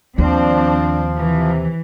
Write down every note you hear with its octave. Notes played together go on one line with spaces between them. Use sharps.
D#2 F3 C4 D4
C3 E3